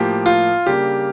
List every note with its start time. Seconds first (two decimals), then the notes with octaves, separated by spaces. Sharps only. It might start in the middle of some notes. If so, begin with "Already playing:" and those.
Already playing: A2 F3 A#3 G4
0.26 F4
0.66 C#3 G3 A#3 D4 G4